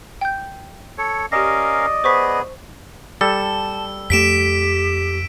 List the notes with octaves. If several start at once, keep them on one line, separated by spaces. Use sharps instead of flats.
G5 G6
A4 C#5
C#4 G4 A#4 D5 D#5 F5 A#6
B3 G#4 C5 C#6 B6
G3 A4 A5 E6
F2 A3 G4 B6 D7 E7